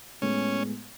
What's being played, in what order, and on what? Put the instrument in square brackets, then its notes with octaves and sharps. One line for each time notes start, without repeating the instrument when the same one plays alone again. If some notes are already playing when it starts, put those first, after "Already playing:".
[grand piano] A2 G#3 B3 [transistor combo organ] C#4